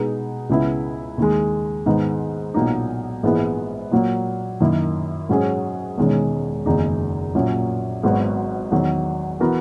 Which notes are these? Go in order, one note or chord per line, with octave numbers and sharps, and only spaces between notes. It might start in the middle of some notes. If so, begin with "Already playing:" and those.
Already playing: B2 G#3 D#4 G#4 B4
C#2 C#3 G#3 B3 E4
D#2 D#3 G#3
G#2 D#3 G#3 B3 D#4
B1 A#2 F#3 A#3 D#4
A#1 G#2 E3 G#3 B3
A#2 F#3 A#3
F#2 D#3 A#3 E4
G#2 F#3 C#4 G#4
E1 E2 D#3 G#3 C#4
F#1 E2 D#3 G#3 D#4
A#1 A#2 F#3 A#3 C#4
G#1 G#2 F#3 B3 F#4
E2 D#3 F#3
E3 B3 F#4 A#4